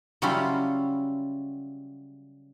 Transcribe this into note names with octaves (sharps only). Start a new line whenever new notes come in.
C#3 F#3 G3 C#4 E4 F4